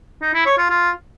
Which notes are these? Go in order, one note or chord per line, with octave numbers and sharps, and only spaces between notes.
D#4
E4
C#5
F4
F4